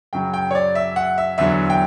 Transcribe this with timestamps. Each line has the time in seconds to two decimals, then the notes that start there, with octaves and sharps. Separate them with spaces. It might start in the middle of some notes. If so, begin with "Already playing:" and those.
0.13 F#2 C#3 F#3 G5
0.33 G5
0.51 C#5
0.55 D5
0.75 E5
0.96 F#5
1.18 E5
1.38 E2 D3 F#3 E5
1.70 G5